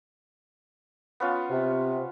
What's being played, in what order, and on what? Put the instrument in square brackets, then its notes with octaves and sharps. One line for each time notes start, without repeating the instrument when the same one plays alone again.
[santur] B3 C#4 F4
[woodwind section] C3